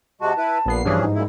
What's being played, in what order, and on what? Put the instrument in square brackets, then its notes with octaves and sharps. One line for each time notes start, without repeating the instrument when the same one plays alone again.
[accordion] C3 G#3 F#4 [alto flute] A5
[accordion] E4 B4
[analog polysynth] A#1 B3 C7 [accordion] A#2
[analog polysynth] G2 E3 F3 [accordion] C#4 D4 G#4
[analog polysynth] G#2 [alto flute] D#4
[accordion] F#2 A#2 E4